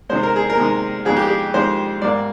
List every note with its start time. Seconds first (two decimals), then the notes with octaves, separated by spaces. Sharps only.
0.09 C3 D#3 G#3 C5
0.23 A#4
0.36 G#4
0.50 A#4
0.57 C3 D#3 G#3
1.05 F2 D#3 G#3 G#4
1.17 G4
1.27 G#4
1.54 F2 D#3 G#3 C5
2.02 G#2 G3 A#3 D5